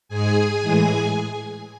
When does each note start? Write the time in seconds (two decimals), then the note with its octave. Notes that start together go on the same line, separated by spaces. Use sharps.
0.08 G#2 G#3 G#4 G#5
0.62 A2 E3 G#3